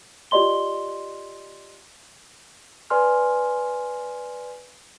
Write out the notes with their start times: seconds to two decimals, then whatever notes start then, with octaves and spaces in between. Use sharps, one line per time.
0.31 F4 G4 D5 D#5 C6 G7
2.90 B4 D5 G#5 C6 F6